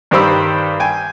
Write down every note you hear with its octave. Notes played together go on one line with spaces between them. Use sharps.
G2 D#3 G4 C5 B5 E6
G5 G#5